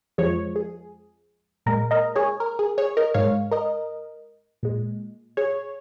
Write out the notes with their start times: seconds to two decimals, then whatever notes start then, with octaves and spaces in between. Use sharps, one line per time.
0.18 F2 F3 G#3 G#4 C#5
0.56 G#4
1.66 A#2 G#3 A#4
1.91 A#4 D#5
2.16 G#4 C#5
2.40 A#4
2.59 G#4
2.78 G#4 C#5
2.97 A#4 D#5
3.14 G#2 G#3 C#5 F5
3.52 A#4 D#5
4.63 A#2 G#3
5.37 G#4 C#5